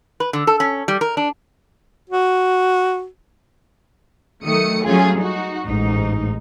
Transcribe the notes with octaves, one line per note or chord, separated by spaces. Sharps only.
B4
D3
A4
C#4
G3
A#4
D4
F#4
D#3 F#3 A3 D#6 C#7
F#3 G3 A3 C#4 F4 G#4
D#4 F#4
A1 G#2 D#4